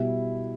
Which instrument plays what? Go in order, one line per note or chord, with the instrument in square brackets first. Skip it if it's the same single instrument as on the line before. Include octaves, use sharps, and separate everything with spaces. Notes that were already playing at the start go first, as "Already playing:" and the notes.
Already playing: [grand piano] B2 G3 E4